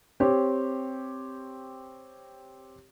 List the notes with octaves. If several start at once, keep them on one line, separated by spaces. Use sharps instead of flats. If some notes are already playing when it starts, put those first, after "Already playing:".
C4 G4 C#5